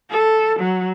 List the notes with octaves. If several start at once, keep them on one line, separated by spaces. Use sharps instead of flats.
A4
F#3